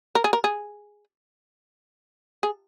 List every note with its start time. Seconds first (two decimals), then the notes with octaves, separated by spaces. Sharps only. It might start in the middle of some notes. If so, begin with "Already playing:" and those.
0.15 A#4
0.24 G#4
0.33 A#4
0.44 G#4
2.43 G#4